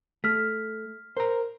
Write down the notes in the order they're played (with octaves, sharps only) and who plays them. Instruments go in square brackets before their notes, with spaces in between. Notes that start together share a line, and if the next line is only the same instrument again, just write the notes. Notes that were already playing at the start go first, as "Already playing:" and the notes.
[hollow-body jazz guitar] A3 [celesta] F6 B6
[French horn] A#4 [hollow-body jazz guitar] C5 A#5